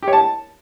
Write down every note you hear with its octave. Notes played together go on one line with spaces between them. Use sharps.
G4
C#5
A5